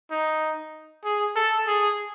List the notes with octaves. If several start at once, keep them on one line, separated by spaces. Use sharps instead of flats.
D#4
G#4
A4
G#4